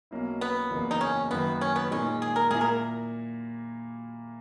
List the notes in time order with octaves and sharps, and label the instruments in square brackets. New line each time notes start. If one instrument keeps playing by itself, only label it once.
[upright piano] B1 B2 A#3 C#4 E4
[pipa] B3
[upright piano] F#1 E2 C#3 E3 A#3
[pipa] D#4
C#4
[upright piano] F#2 D#3 A#3 [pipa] B3
[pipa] C#4
B3
[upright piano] A#2 G#3 D#4 [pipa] C#4
[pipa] G#4
A#4
[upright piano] A#2 A#3 E4 [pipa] G#4
[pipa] A#4